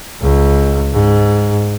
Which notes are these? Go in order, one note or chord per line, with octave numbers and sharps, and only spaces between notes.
C#2
G#2